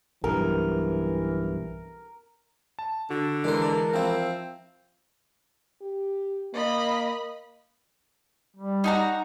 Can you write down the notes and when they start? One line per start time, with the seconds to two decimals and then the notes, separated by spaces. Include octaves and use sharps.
0.24 B1 G2 E3 A#4
2.79 A5
3.10 D3 F#4
3.44 E3 G#3 D4 A#4 C5
3.62 D4
3.94 F3 C4 E4
5.81 G4
6.53 A#3 D#5 B5
8.56 G3
8.84 D#4 F#4 A#5